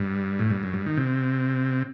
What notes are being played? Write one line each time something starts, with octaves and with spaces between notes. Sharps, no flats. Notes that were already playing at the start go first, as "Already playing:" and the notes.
Already playing: G2
A2
G2
F#2
G2
D#3
C3